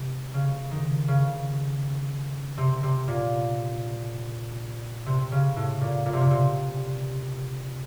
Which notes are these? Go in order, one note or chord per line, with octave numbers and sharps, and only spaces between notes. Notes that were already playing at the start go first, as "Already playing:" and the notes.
Already playing: C3
C#3
D#3
C#3
C3
C3
A#2
C3
C#3
A2
A#2
A#2
C3
A#2
C3